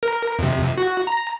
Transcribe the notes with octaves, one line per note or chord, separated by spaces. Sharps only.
A#4
F2 C3
F#4
A#5